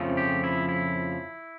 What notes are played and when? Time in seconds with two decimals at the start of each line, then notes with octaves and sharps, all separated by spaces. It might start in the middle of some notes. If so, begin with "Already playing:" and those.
Already playing: F2 C#3 F3 A3
0.17 G4
0.44 E4
0.69 E4